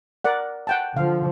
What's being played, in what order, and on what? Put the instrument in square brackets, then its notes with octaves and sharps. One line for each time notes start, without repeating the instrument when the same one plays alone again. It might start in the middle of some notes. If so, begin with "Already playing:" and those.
[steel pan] A#4 D5 F#5
F#5 G5 A5
[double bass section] D3 F3 [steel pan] F5